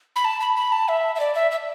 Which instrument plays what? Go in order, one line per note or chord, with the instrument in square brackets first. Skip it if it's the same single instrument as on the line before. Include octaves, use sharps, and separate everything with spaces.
[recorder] B5
A5
B5
B5
A5
E5
E5
D5
E5
E5